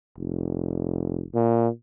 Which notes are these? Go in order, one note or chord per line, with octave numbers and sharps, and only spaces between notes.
F1
A#2